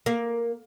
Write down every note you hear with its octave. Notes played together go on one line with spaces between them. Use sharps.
A#3